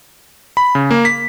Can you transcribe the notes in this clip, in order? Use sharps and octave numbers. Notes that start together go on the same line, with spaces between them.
B5
C#3
A#3
B6